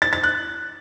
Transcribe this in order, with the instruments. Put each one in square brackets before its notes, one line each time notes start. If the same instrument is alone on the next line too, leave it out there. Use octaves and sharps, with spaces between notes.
[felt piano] A6
A6
F#6